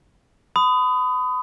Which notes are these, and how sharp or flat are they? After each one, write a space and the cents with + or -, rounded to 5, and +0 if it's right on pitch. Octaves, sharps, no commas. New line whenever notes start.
B5 +35 D#6 +0